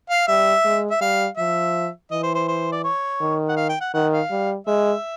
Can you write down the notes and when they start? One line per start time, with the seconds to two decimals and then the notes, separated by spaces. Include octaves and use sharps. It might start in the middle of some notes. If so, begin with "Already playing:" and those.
0.10 F5
0.28 G3 E5
0.65 G#3
0.91 E5
1.01 G3 F5
1.37 F3 E5
2.11 E3 D#5
2.23 C5
2.35 C5
2.48 C5
2.72 D5
2.84 C#5
3.21 D#3
3.49 F#5
3.57 F5
3.69 G5
3.81 F#5
3.94 D#3 F#5
4.12 F5
4.31 G3
4.67 G#3 E5